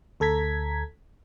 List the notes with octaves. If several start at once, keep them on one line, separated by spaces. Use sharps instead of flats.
D2 A4 A#5 G#6 B6